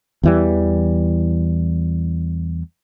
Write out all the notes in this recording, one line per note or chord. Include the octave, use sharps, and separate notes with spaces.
E2 E3 G3